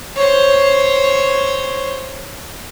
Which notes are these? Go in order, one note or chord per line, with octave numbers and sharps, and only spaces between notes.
C5 C#5